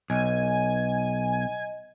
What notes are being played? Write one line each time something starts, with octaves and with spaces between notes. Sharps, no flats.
B1 D#5 G#5